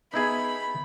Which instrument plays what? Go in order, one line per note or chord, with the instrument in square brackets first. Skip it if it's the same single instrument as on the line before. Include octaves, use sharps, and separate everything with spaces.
[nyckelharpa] B3 [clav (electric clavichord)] D#4 E4 G#4 [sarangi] B5